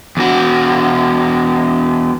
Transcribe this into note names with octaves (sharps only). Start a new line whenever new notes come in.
E2 F#4